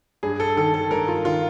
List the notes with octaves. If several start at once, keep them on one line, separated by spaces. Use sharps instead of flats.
G2 G#4
A4
D#3 A4
A4
G2 A#4
F4
D#3 F4